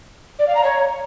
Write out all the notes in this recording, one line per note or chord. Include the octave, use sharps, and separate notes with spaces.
D5
F5
A#5
C#5